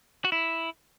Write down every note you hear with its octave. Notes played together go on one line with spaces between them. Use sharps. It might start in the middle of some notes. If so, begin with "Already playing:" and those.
F#4
E4